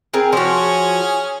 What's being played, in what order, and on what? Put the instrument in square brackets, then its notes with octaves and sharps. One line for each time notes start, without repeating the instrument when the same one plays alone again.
[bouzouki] C4 G#4 A#4
[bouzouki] F3 F#4 [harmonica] C#4 G#4